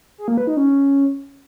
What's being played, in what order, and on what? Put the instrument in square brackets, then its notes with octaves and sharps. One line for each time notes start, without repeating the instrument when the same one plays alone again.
[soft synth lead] G#4
A#3
B4
D#4
C#4